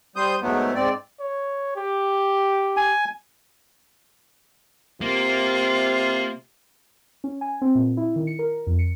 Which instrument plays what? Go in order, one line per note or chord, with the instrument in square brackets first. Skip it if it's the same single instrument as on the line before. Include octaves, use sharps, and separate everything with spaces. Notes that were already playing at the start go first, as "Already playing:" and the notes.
[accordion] G3 C5 D#6 G6
G#2 F#3 A3 B3
G#2 C4 D5
[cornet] C#5
G4
[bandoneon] G#5
[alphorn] C3 [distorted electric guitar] A#3 [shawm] F4
[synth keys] C#4
G#5
C4
A#2
E4
D#3
C#7
A#4
F2
C#7